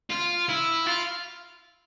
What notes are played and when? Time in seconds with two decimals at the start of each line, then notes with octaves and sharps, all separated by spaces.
0.10 F4
0.49 E4
0.86 F4